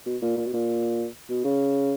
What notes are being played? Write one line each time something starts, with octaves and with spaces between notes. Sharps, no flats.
B2
A#2
A#2
B2
A#2
B2
C#3